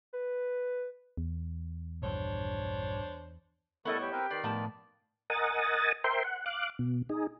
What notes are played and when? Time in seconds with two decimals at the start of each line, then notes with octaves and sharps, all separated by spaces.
0.13 B4
1.17 E2
2.02 A#1 G2 D4 C5 C#5
3.85 A2 G3 B3 E4 A4 A#4 D#5 C#6
4.01 G4 C#5
4.12 C4 A#4 B4 G5
4.30 D#3 B4 D5 C7
4.44 A2 F3 B3 A5
5.30 A#4 D#5 F#5 G#5 D#6 A6
6.04 A#4 C5 E5 G5 C6
6.24 F#5
6.46 F5 D6 F#6
6.79 B2
7.09 D#4 G#4